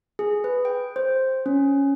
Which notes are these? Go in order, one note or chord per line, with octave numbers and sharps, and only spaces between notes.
G#4
B4
G5
C5
C#4